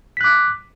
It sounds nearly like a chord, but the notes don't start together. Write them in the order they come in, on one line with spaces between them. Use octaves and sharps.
B6 F#6 D6